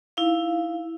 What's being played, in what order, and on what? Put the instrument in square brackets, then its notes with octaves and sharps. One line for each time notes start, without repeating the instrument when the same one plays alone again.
[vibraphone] D#4 E4 F5